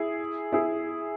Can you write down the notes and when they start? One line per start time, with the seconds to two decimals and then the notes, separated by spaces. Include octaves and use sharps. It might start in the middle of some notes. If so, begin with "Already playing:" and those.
Already playing: E4 G#4
0.52 E4 G#4